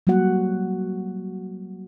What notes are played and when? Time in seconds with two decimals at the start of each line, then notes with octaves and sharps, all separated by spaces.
0.07 F#3 G3 A#3 F#4 F#5